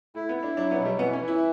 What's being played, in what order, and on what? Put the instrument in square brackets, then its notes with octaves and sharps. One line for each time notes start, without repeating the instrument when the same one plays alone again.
[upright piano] A3 [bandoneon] E4
[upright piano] B3
[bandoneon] E4
[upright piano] D4
[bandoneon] F#3 [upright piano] D4
[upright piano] B3
[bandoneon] B2
[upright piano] G3
[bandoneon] E3 [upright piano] B3
[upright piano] C#4
[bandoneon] E3
[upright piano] E4